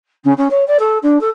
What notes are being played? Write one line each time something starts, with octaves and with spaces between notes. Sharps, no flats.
C#3
C#4
C#5
D5
A4
D4
A4